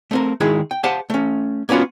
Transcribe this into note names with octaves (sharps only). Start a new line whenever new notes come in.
A3 C4 A#4
D#3 G#3 E4 G#4
G5
G4 C5 F5 F#5 A5
A3 C#4
A#3 B3 C#4 F4 F#4